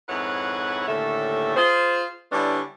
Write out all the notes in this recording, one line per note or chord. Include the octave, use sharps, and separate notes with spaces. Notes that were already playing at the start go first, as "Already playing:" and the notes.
F2 G#2 E4 B4 C#5 F#5
D#2 A2 D3 C#4 A4 E5
F4 G#4 C5
D3 G3 B3 C#4 D4 E4